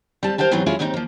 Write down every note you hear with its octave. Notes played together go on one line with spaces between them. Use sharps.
G3 C4 A5
A#4 C5 F5 G5 A5
G#2 E3 F#3 B3 C4 F4
F#3 G#3 C#4 E4 F4 G#4
D#2 G#2 C#3 C4 D#4
F3 A#3